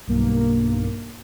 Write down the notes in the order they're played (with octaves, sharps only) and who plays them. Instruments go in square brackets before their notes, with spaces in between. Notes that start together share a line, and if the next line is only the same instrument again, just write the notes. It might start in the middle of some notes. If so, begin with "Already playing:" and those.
[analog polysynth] B1 G2 A#3